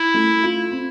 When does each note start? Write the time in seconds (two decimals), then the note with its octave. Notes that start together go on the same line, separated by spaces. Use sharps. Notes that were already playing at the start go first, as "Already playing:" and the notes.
Already playing: E4
0.14 A3
0.43 F4
0.71 C4